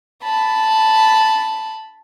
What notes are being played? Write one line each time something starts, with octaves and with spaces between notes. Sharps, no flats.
A5 B5